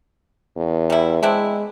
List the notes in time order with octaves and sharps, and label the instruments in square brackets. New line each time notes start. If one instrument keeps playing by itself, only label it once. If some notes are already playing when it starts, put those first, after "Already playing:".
[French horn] E2
[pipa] G3 E4
[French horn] G#3 [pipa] C4 D4 E4